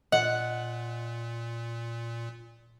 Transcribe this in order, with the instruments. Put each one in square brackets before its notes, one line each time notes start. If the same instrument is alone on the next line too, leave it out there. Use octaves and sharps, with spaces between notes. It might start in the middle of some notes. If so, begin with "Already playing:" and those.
[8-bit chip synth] A#2 [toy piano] D#5 [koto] F#5